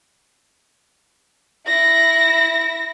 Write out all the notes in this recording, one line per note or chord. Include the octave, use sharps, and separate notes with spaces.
E4 A#6